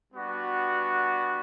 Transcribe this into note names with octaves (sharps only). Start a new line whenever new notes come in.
G3 B3 D4 F#4